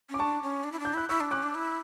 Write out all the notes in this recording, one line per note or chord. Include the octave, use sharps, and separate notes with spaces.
C#4 D6
D4 A5 C#6
C#4
D4
E4
D4
G6
E4 F#6
E4 C#6 E6
D4
C#4 D6 F#6
D4
E4